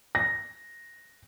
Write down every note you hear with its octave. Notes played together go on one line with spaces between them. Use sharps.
A#6